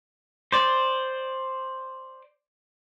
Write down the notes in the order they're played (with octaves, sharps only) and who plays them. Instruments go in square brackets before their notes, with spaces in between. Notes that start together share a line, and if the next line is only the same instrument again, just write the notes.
[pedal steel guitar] C5 D5